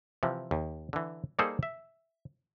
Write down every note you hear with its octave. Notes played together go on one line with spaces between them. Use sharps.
C3 E3 F3
D#2
D3 E3
G3 A#3 D#4 G#4 A4 C5
E5